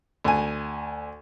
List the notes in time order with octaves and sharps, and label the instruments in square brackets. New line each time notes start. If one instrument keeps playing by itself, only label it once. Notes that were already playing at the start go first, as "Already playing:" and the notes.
[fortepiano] D2 G#5